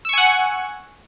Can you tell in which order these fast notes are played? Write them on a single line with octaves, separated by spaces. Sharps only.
E6 C#6 G#5 F#5